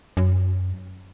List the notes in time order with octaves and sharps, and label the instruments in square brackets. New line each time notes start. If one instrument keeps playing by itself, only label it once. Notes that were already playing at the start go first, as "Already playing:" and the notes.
[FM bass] F#2